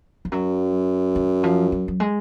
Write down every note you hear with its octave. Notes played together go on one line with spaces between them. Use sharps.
F3
F#2 F#3
D#3
F3
F#3
F#3
G#3